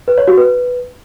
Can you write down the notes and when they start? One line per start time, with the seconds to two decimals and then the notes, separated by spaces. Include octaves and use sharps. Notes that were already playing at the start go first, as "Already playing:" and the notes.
0.08 B4
0.18 C#5
0.28 F#4
0.37 B4